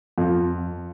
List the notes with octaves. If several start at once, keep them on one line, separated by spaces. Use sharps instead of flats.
F2